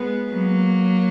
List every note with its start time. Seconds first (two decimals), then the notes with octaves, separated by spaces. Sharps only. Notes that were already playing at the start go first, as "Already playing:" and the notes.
Already playing: G#3 B3
0.32 F#3 A#3